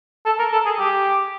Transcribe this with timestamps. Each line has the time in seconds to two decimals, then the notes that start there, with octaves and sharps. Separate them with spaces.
0.26 A4
0.39 A#4
0.53 A4
0.66 G#4
0.79 G4